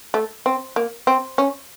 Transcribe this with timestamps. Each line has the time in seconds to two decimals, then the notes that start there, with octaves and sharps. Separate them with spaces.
0.14 A3
0.46 C4
0.76 A#3
1.07 C4
1.38 C#4